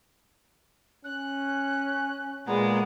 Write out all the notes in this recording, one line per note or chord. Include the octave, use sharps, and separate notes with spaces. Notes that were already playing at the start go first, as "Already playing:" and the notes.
C#4 F#6
A#2 G#3 B3 A#5